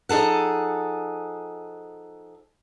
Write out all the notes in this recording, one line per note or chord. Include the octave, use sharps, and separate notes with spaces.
F3 D#4 G#4 A4 F#5